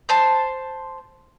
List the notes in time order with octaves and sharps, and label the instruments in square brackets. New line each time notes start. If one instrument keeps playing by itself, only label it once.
[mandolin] C5 A5 C6